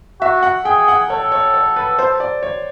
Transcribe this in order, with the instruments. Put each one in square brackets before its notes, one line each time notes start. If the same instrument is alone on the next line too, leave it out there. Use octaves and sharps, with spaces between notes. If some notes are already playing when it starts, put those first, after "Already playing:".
[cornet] F#4 [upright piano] E5
[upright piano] F#5
[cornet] G#4 [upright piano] G5
[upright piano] F#5
[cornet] A4 [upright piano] C#5
[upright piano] C#5
C#5
B4
C5
D5
C#5